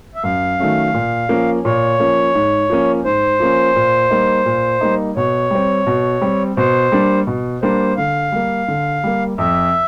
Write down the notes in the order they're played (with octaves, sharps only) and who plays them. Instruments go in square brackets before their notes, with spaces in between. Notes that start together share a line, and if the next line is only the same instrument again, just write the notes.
[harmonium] E5
[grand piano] F#2 [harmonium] F5
[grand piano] D#3 F#3 A3 C#4
A#2
F3 A#3 C#4
[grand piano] A#2 [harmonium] C#5
[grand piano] F3 A#3 C#4
G#2
F3 A#3 C#4
[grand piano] G#2 [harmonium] C5
[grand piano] F3 A#3 C#4
A#2
G3 A#3 D#4
A#2
G3 A#3 D#4
[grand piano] B2 [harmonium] C#5
[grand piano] G3 C4
B2
G3 C4
[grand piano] B2 [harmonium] C5
[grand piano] G3 A#3 D4
B2
[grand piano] G3 A#3 D4 [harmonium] C5
[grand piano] D3 [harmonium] F5
[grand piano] G3 A#3
D3
G3 A#3
[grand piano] F2 [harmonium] E5